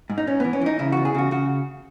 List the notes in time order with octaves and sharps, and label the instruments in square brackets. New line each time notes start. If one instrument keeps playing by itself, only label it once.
[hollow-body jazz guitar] G#2
D#4
G#2 C#4
E3 B3
C#4
E3 D#4
C#3 E4
E2 F#4
G#4
C#3 F#4
C#3 F#4